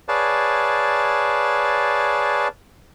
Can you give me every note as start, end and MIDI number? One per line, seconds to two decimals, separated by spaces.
0.09 2.48 68
0.09 2.48 71
0.09 2.48 73
0.09 2.48 74
0.09 2.48 77
0.09 2.48 81